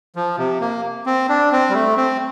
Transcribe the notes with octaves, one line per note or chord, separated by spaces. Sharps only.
F3
C3
A#3
C4
D4
C4
G3
A3
C4